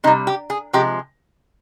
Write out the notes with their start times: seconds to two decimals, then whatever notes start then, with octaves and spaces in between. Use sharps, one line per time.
0.04 C3 D#4
0.07 G3
0.27 G4
0.50 G#4
0.73 C3 F3 G#3 G4